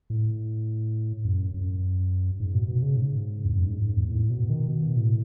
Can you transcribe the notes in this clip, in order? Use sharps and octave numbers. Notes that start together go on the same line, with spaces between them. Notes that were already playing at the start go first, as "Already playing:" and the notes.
A2
F#2
F#2
G#2
B2
B2
C#3
G#2
E2
F#2
G#2
G#2
E2
A2
B2
D#3
B2
A2